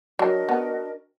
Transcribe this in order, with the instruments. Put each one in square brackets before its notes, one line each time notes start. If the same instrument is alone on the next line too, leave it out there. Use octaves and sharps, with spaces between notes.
[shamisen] F#3 [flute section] D4 F#4 A#4 D#5
[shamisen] B3